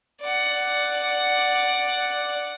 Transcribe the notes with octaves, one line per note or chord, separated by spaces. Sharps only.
D5 F#5